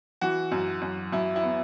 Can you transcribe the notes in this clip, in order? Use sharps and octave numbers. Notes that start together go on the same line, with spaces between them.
E3 F#4
F#2
F#2
F#2 E4
E4
B3